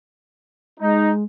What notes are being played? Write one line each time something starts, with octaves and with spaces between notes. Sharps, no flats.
G#3 D#4